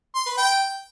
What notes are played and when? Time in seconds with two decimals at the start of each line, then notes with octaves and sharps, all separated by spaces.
0.15 C6
0.26 B4
0.38 G5